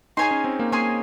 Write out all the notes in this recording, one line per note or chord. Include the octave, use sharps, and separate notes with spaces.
D#4 G#4 C#5 G#5 C6
C#4
C4
A#3
A#3 G#4 C#5 G#5 C6